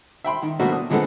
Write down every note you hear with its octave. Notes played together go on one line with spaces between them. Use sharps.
E5 G5 B5 C6
D#3
B2 A3 A#3 C4 D4 F#4
D#6
A#2 D3 G#3 B3 C4 A4